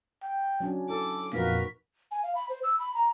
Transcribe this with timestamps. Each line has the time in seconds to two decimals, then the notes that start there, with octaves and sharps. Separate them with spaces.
0.23 G5
0.60 F#3 C#4 D4
0.90 E4 A4 D6
1.33 F2 A#2 D#4 F#4 A#4 B4 F5 B6
2.11 G#5
2.23 F5
2.35 B5
2.49 C5
2.63 E6
2.79 B5
2.94 A#5